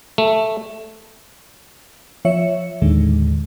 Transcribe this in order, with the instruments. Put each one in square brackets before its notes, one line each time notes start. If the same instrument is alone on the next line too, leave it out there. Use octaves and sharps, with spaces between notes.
[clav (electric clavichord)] A3
[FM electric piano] F3 C#5 E5 C#7
D#2 A2 D3 D#3 G#3